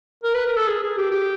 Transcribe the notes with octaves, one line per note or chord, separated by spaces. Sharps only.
A#4
B4
A#4
A4
G#4
G#4
G4
G4